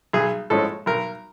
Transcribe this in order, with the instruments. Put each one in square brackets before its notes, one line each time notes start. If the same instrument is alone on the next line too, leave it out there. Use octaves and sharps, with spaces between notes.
[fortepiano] B1 G#4
A2 F3 G#3 C#4 A4
B1 A#4